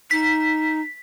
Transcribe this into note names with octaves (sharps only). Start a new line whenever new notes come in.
D#4 B6